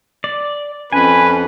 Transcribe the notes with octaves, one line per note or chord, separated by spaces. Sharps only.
D5
F2 C#4 B4 G#5